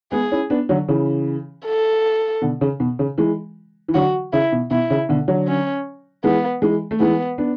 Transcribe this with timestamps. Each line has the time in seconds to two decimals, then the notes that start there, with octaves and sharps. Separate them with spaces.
0.12 G#3 B3 G#4
0.32 C#4 E4
0.50 B3 D4
0.69 D3 F#3
0.88 C#3 E3
1.65 A4
2.42 B2 D3
2.61 C#3
2.80 B2
2.99 C#3
3.18 E3 G#3
3.88 E3
3.94 D3 F#3 F#4
4.33 C#3 E4
4.52 B2
4.71 B2 E4
4.90 C#3
5.09 B2 D3
5.28 D3 F#3
5.48 C#4
6.24 E3 G#3 B3
6.62 E3 G#3
6.91 A3
7.00 E3 G#3 B3
7.38 B3 D4